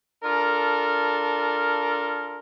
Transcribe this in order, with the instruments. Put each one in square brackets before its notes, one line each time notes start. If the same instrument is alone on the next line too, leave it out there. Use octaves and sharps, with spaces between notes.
[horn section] D4 F4 A4 A#4